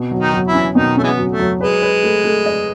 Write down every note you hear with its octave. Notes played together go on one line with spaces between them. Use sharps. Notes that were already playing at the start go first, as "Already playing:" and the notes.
Already playing: B2
F#3
D#3 D#4
F#3
E3 E4
C#4
B2 D#3 D#4
A3 C#4
E3 G#3 B3
F#3
A3
F#3
G#3 B4
B4
A3
A3
D#5